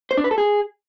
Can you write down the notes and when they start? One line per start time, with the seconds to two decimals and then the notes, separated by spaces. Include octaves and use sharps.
0.11 C5
0.17 D4
0.24 B4
0.31 A4
0.38 G#4